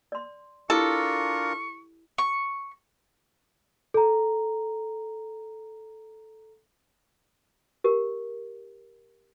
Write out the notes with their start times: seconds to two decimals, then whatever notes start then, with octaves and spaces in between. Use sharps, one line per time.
0.12 D5 C6
0.70 D4 E4 F4 G4 A4 A#4 C#6
2.18 C#6
3.94 A4 A#5
7.84 G4 A#4